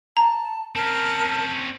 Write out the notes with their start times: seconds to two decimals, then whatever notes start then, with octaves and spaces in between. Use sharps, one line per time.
0.17 A5 A#5
0.75 C4 C#4 A#4 A5